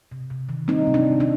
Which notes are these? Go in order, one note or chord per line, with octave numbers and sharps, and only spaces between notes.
C3
C3
D#3
G3 C4 D#4
C3
D4
C3
D4